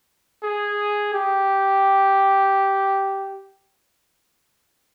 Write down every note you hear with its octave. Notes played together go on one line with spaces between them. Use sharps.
G#4
G4